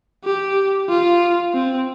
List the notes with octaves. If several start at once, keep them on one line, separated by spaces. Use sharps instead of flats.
G4
F4
C4